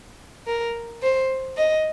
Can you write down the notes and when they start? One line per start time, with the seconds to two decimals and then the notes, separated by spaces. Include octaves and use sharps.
0.47 A#4
1.02 C5
1.57 D#5